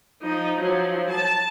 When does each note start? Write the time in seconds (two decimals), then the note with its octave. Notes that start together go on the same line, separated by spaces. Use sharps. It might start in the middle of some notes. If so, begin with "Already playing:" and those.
0.22 F3 D#4
0.60 F3 F#3
1.10 A5